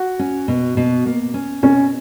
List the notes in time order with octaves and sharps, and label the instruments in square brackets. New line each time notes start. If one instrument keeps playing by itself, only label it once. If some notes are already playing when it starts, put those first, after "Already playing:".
Already playing: [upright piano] F#4
[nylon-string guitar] C#4
B2
B2
A#3
C#4
[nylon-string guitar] B2 [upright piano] C#4